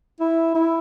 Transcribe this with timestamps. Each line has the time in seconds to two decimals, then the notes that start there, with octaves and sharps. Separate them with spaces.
0.20 E4
0.55 E4